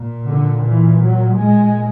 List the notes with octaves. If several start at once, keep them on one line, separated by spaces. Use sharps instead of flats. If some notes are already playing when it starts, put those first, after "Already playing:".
Already playing: A#2
D3
E3
F#3
A#2 G#3